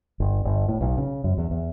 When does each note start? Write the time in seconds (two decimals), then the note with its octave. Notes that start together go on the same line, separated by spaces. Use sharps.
0.20 G1
0.45 G1
0.68 A2
0.81 B1
0.98 C#3
1.24 F#2
1.38 E2
1.51 E2